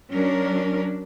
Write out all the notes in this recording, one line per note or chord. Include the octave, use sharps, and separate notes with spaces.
F#3 C#4 D4 A#4